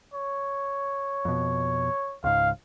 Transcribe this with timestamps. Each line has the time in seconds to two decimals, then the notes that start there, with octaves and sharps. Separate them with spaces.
0.14 C#5
1.25 F2 B2
2.24 C#2 G#2 F5